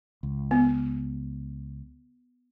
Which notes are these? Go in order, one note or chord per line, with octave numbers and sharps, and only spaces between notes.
C#2
B3